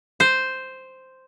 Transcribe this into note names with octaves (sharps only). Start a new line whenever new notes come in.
C5